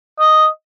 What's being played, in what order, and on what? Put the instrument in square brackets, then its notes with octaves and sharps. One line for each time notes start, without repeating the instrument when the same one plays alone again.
[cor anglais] D#5